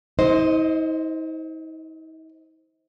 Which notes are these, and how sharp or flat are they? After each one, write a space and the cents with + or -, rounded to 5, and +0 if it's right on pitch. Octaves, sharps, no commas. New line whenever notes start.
D#4 +45 C5 +0 D#5 +0